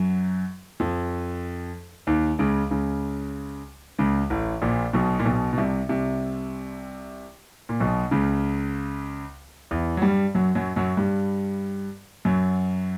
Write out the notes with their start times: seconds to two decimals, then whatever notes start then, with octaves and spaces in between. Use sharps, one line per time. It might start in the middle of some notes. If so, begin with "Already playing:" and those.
Already playing: F#2 F#3
0.80 F2 F3
2.07 D#2 D#3
2.39 C#2 C#3
2.71 C#2 C#3
3.99 C#2 C#3
4.30 A1 A2
4.62 A#1 A#2
4.93 B1 B2
5.19 A#2
5.25 B1 B2
5.53 B2
5.57 C2 C3
5.89 C2 C3
7.69 A#2
7.80 B1 B2
8.11 C#2 C#3
9.71 E2 E3
9.97 F#3
10.02 G2 G3
10.35 F#2 F#3
10.55 F#2 F#3
10.76 F#2 F#3
10.97 G2 G3
12.25 F#2 F#3